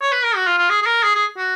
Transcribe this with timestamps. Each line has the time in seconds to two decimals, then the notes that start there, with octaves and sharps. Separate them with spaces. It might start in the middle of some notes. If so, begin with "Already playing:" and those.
0.02 C#5
0.12 B4
0.24 A#4
0.36 F#4
0.47 F4
0.58 F4
0.70 G#4
0.82 G#4
0.86 A#4
1.03 G#4
1.15 G#4
1.38 F#4